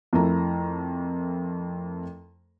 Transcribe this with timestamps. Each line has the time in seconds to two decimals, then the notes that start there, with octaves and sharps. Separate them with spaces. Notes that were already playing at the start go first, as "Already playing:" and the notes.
0.13 F2 A3 E4 A#4 A#5